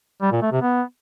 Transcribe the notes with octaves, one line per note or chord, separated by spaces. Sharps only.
G3
A#2
A3
C3
B3